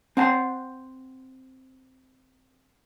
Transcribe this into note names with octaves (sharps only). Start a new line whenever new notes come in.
C4 F#5 A5 C6